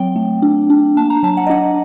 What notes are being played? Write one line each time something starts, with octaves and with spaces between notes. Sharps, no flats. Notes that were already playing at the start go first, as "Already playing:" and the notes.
Already playing: F#3 C4 G5
A3
D4
D4
A#3 A5
A#5
F#3 A5
F#5
D#5
D4 F#5